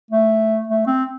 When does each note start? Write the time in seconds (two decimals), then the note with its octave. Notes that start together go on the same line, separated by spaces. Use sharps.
0.11 A3
0.68 A3
0.87 C4